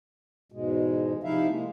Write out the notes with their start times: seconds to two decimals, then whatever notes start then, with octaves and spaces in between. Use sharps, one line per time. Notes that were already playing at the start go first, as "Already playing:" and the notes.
0.52 E2 G#2 B2 G#3
1.23 C3 F3 D#4 E4 E5 F5
1.48 G#3 A#3